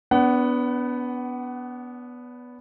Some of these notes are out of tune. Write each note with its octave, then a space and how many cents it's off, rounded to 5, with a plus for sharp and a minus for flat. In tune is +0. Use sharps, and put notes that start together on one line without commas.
B3 +0 D4 -35 F#5 +30